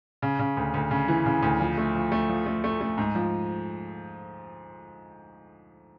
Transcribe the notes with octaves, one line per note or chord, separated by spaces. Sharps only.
C#3
C#3
D2
D2
C#3
E3
C#3
D2
F3
A3
F3
A3
F3
A3
A3
A3
G#2
F3